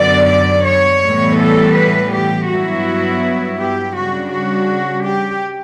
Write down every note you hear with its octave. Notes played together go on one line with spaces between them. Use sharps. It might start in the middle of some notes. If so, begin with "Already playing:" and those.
Already playing: F#2 D3 F#3 B3 D5
D5
C#5
A2 E3 G3 B3
A4
B4
G4
G2 F#3 B3 E4 F#4
G4
C#3 G3 D4 F#4
F#4
G4